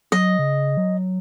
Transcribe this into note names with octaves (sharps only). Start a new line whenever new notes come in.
F#3 D#5
C#3
F#3